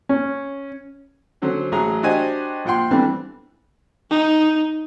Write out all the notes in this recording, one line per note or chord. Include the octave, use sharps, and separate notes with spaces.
C#4
D3 F#3 C#4 C5
A1 F#3 G#4 A#5
D4 F#4 G4 C5 D#5 G#5
A#1 F4 F#5 G5 C6
E3 G3 A3 B3 C4 D4
D#4